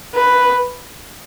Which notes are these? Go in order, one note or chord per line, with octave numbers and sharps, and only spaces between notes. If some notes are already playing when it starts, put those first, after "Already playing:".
B4